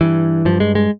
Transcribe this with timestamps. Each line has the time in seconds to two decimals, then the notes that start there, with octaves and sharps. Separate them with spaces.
0.01 G2 E3
0.45 G2 F3
0.60 G#3
0.75 G#3